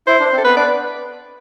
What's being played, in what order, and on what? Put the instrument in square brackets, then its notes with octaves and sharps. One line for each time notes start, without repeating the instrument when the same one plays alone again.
[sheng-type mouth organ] E4 [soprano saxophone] C5
[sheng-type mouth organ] D4
[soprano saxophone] C5
[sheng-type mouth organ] C4
[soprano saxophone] A4
[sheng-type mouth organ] B3 [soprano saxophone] B4
[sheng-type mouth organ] D4 [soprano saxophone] D5